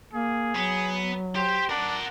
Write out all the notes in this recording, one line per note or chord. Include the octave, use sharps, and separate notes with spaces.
A#3 G#4
F#3 B3
G4 C5
D4 A#4 F#5